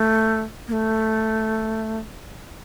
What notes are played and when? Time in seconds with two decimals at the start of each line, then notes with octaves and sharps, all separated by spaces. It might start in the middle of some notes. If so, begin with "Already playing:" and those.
Already playing: A3
0.68 A#3
0.72 A3